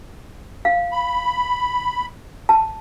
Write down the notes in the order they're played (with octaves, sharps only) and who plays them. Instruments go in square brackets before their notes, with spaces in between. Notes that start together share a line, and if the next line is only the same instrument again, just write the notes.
[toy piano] F5
[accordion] B5
[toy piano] A5